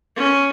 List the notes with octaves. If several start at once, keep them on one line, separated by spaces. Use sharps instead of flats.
C#4